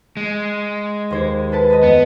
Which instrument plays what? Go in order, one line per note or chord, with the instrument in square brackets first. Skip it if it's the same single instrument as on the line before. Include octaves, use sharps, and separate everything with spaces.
[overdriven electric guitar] G#3
[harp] D#2 C5 G#6
A4 B4 A5
B4 D#5
[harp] F2 [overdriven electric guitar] B3